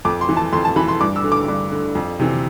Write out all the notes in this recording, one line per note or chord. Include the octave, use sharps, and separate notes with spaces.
F2 D6
C6
E3
A5
F2 C6
A5
E3 B5
C6
G2 D6
E6
D3
D6
G2
D3
F2
C3 E3